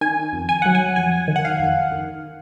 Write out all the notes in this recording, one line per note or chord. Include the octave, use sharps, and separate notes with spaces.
D#3 G#5
F2
G#5
F#3 F#5
G#5
F2 G#5
D#3
F#5
F5
F2
D#3